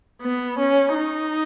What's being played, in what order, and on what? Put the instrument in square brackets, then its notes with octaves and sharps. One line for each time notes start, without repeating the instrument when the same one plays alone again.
[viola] B3
C#4
D#4